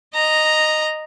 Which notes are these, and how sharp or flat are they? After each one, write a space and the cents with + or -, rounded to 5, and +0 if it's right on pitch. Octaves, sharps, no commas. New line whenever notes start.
D#5 -10 A#5 +0